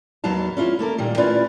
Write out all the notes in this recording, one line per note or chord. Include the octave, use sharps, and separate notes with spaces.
D#2 F#3 B3 F5 A5
C#4 E4 F4
A3 A#3 A4 A#4
A#2 D#3 G3
A3 C#4 E4 F4 B4 D5